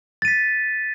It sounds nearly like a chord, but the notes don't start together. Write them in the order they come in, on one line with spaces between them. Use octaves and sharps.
A6 D#7 B6